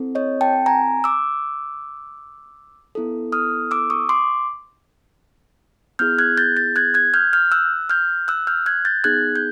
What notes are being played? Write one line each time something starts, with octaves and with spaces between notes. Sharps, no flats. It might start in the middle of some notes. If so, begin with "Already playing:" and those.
Already playing: C4 E4 A4
C#5 D#5
G5 A5
G#5 A#5
D6 E6
B3 E4 A4
D#6 F6
D6 E6
C#6 D#6
C6 D6
B3 E4 G#4 F6 G6
F#6 G#6
G6 A6
G6 A6
F#6 G#6
F#6 G#6
F6 G6
F6 G6
E6 F#6
F6 G6
E6 F#6
F6 G6
F#6 G#6
G6 A6
B3 D#4 G#4 F#6 G#6
G6